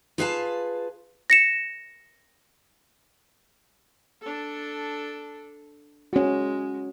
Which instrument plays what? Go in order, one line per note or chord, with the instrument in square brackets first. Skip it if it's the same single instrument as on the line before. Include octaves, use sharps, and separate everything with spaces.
[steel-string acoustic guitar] F4 G#4 B4 F5 G5 A5
[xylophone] A#6 C#7 E7
[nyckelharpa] D4 A4
[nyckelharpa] G#3 [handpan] C#4 F#4